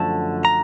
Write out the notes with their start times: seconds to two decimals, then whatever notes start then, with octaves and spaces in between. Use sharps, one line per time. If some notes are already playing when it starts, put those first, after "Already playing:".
Already playing: F#2 D3 F3 A3 A5
0.45 A#5